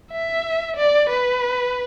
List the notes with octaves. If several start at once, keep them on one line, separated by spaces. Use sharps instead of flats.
E5
D5
B4